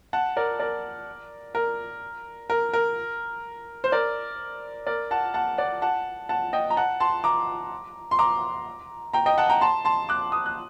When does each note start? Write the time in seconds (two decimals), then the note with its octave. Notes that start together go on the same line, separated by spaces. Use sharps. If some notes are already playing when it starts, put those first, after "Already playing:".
0.13 F#5 A5
0.37 A#4 D5
0.60 A#4 D5
1.55 A#4
2.50 A#4
2.73 A#4
3.84 C5
3.92 A#4 D5
4.87 A#4 D5
5.11 F#5 A5
5.34 F#5 A5
5.58 D5 F#5
5.82 F#5 A5
6.29 F#5 A5
6.53 D#5 G5
6.70 A#5
6.77 F#5 A5
7.00 A5 C6
7.24 A#5 D6
8.11 C6
8.19 A#5 D6
9.13 G5 A#5
9.26 D#5 G5
9.38 F#5 A5
9.50 G5 A#5
9.61 A5 C6
9.85 A5 C6
10.09 D6 F#6
10.32 D#6
10.46 F#6